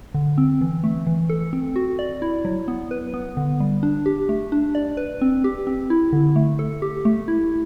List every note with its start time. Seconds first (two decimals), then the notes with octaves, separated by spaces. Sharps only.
0.14 D3
0.38 C4
0.61 E3
0.84 A3
1.07 E3
1.29 A4
1.53 C4
1.76 F#4
1.99 D5
2.22 E4
2.45 F#3
2.68 B3
2.91 B4
3.14 B3
3.37 D3
3.60 G3
3.83 D4
4.06 G4
4.29 A3
4.52 D4
4.75 D5
4.97 B4
5.21 C4
5.44 G4
5.67 C4
5.90 E4
6.13 D3
6.36 A3
6.59 A4
6.82 G4
7.05 A3
7.28 E4